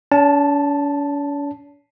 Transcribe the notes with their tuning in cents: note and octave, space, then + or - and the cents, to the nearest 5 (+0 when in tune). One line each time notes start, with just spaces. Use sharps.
C#4 +45 A5 +0